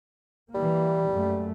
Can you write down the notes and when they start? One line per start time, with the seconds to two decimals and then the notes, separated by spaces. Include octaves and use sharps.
0.54 E3 G3 A#3
1.13 F#2 A3